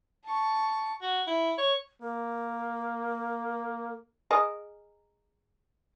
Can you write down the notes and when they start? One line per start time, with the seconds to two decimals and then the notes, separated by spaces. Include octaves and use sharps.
0.24 A5 C#6
1.02 F#4
1.27 E4
1.58 C#5
2.02 A#3 A#4
4.31 G#4 A#4 D#5